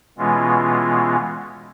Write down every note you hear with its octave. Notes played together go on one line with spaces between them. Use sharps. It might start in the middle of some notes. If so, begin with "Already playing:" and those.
B2 E3 G#3 B3 C#4 F4